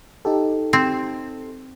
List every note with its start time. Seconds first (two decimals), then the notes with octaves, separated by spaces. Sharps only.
0.25 D#4 G4 A4
0.73 C4